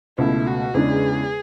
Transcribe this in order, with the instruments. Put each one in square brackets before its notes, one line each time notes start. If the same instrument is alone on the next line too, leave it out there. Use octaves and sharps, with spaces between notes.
[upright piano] C#2 B2 A3 [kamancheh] E4
[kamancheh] F#4
[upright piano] E2 C#3 G#3 D4 [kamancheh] G#4